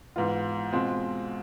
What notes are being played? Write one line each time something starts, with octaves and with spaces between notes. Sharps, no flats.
G#2 E3 B3 F4
B2 G#3 C4 F4